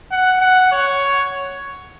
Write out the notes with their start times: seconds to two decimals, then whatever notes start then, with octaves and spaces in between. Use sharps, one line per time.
0.11 F#5
0.41 F#5
0.72 C#5